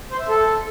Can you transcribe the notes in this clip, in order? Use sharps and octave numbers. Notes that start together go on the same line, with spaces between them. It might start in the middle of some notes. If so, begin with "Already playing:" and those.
C5
E5
A4